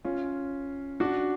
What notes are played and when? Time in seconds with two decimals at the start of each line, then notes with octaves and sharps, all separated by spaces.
0.05 C#4 F4
1.00 D4 F#4